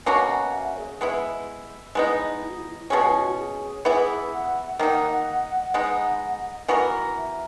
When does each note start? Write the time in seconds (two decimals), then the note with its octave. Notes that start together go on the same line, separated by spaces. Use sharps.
0.06 B2 A#3 C#4 F#4 G#5
0.30 F#5
0.54 E5
0.77 G#4
1.01 G#3 B3 E4
1.95 G#3 B3 D#4 E4
2.42 E4
2.50 F#4
2.58 E4
2.90 B2 G#3 C#4 G#4
3.00 F#4
3.10 E4
3.21 F#4
3.38 G#4
3.84 E3 B3 E4 G#4 A#4
4.32 F#5
4.79 D#3 A#3 D#4
5.74 G#3 B3 D#4
6.68 E3 B3 F#4 A#4
7.16 E5